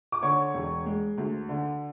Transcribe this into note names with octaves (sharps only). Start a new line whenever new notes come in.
D6
D3 C#5 C#6
E1
G#3
D2
D3